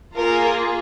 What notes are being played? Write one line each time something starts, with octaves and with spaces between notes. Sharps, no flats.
A#3 F4 G#4 A#4